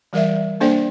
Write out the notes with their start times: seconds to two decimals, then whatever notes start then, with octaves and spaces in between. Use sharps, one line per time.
0.13 E3 G3 A#4 D5 E5
0.61 A#3 D4 A4 C5 D5 G5